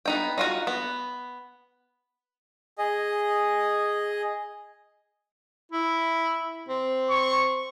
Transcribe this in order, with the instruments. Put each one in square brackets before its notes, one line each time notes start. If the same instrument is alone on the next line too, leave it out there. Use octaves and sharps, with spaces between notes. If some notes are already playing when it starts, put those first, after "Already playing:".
[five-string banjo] B3 D#4 G5
D#4 F4 F#4
B3
[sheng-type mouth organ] G#4 D#5
[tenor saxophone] E4
C4
[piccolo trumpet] C#6